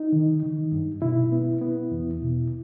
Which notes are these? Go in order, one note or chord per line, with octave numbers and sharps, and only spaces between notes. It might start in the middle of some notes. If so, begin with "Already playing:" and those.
Already playing: D#4
D#3
D#3
G2
B2 E4
B3
B3
E2
B2